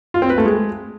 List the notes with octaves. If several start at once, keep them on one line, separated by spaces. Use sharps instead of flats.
F4
C4
B4
A3
G#3